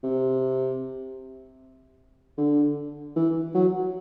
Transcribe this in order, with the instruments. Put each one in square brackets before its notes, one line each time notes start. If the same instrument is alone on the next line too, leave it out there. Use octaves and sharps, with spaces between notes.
[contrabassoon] C3
D3
E3
F#3